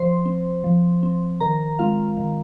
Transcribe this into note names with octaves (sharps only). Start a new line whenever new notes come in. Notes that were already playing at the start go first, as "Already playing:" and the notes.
Already playing: F3 C5 C6
C4
F3
C4
D#3 A#4 A#5
G#3 C4 F4 F5
D#3